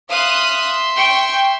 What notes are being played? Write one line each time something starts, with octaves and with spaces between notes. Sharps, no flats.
E5 F5 C6 D#6 F#6
G5 C#6